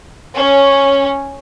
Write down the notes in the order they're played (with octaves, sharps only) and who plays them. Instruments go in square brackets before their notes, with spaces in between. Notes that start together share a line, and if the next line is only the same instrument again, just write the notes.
[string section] C#4